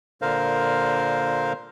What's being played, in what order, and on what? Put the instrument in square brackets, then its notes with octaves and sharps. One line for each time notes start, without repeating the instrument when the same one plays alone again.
[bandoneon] A#2 D3 A#4 C5 F5